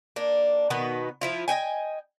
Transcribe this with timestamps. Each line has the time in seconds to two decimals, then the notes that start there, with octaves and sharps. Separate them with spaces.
0.16 A#3 D4
0.70 B2 D#3 B3 B4
1.21 F3 E4 F4
1.48 D#5 E5 G5 G#5